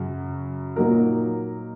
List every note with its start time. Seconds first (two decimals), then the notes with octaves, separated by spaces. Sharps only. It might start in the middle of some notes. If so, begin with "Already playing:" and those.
Already playing: F#2 C#3 F#3
0.76 A#2 F#3 A#3 D#4 A#4